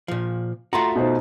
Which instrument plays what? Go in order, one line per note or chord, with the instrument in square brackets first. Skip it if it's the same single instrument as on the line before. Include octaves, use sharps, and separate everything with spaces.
[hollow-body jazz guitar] A#2 F3
[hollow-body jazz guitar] A3 F4 F#4 [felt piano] A#5 C6
[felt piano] B2 D#4 C5